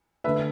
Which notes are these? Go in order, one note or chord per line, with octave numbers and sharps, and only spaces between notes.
D3 A3 B4 E5